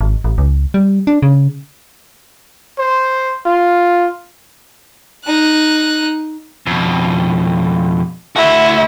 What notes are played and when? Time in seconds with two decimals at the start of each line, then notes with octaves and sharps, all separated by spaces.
0.01 G#1
0.24 A1
0.38 C#2
0.74 G3
1.07 D4
1.22 C#3
2.79 C5
3.46 F4
5.25 D#4 F#6
6.67 F2 B2
8.36 A3 E4 F#4